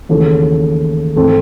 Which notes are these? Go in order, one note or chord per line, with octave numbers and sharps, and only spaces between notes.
D#2 C#3 E3 A3
G#2 E3 A3 C4